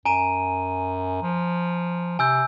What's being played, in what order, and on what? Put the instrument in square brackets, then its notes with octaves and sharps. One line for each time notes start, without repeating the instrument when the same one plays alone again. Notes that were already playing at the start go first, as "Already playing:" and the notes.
[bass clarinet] F#2 [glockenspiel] G#5 A#5 D#7
[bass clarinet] F3
[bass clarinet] C3 [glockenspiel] G#5 E6 G6